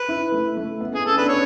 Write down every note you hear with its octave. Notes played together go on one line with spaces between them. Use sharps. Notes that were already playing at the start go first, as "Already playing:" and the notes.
Already playing: B4
E4
A3
A3
B3
B3 G#4
C#4 A4
D4 B4
C#4 C#5